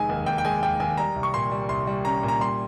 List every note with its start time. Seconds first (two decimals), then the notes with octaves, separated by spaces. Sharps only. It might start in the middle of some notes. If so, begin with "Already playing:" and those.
Already playing: F1 D#3 G#3 G#5
0.09 D#2
0.26 D#2 G5
0.38 G5
0.45 G#3 G#5
0.63 D#2 G5
0.80 D#2 G#5
0.97 G3 A#5
1.16 C2
1.23 C#6
1.34 A#2 C6
1.51 G3
1.69 C2 C6
1.87 G3
2.05 C#4 A#5
2.23 A#2
2.28 A#5
2.40 G3 C6